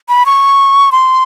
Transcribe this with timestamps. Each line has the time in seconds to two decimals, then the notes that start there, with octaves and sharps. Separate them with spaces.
0.09 B5
0.26 C#6
0.92 C6